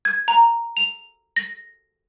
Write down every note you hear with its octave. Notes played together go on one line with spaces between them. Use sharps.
G#6
A#5
F7
A#6